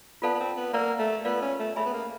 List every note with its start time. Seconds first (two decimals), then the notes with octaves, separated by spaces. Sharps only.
0.22 B3 F4 A4 D5 F5 A5
0.35 B3
0.40 C4
0.57 B3
0.74 A#3 A#4 D5 F#5 A#5
0.99 A3
1.25 B3 F4 A#4 D5 F5
1.42 C#4
1.60 A3
1.76 A3 G#4 C#5 E5 G#5 B5
1.86 B3
1.93 A#3